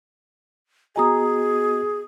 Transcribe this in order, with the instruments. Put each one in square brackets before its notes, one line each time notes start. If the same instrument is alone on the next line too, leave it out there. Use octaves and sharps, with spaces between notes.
[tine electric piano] B3 F#4 D#5 [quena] G#4 [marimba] G#5 A#5 D#6